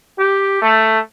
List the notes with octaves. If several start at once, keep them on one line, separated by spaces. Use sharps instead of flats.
G4
A3